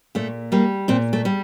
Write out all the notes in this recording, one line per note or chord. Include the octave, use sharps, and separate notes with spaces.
A#2 A3
G3 A#3
A#2 C4
A3
G3